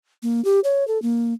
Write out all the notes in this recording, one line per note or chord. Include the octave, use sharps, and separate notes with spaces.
A#3
G4
C#5
A4
A#3